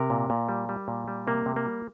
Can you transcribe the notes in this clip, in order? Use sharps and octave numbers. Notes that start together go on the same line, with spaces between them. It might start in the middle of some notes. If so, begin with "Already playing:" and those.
Already playing: C3 A#4
A#2
A#2
G3
G3
A#2
G3
C3 A#3
C3
A#3
G3